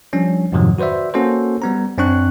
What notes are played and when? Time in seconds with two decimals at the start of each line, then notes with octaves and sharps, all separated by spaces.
0.13 F3 G3 C#4 D4
0.52 F2 G#2 C3 D#3 F3 F#3
0.78 F#4 B4 C5 D5 E5
1.14 A#3 C#4 F#4 A4 C5
1.62 G3 B3 A#5
1.98 F#2 C4 D4 C#6 F#6